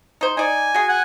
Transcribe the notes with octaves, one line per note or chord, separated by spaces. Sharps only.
D#4 C5
D#4 D5 G#5
F#4 G#4
F#5 G#5